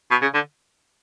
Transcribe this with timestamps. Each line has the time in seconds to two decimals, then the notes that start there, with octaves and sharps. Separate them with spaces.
0.11 B2
0.22 C#3
0.34 D3